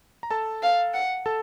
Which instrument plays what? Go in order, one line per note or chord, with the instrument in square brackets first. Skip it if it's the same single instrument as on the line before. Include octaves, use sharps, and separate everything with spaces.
[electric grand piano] A#5
A4 A5
[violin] F5
F#5
[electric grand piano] A4 A5